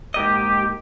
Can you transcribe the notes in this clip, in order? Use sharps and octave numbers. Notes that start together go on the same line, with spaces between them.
G#2 A#3 G4 D#5